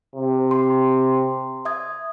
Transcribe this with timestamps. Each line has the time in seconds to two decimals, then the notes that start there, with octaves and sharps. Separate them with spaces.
0.15 C3
0.51 C6
1.65 E5 D#6 G#6